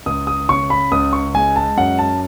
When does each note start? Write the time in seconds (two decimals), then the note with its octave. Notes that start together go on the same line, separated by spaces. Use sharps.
0.06 C#2 D#6
0.27 D#6
0.49 C#3 C#6
0.70 B5
0.92 C#2 D#6
1.13 C#6
1.35 G#3 G#5
1.56 A5
1.77 F#2 F#5
1.99 A5